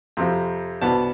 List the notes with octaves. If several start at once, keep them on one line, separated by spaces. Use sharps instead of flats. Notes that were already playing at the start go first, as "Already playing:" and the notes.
F2 C3 F3
C2 B2 B3 D4 A5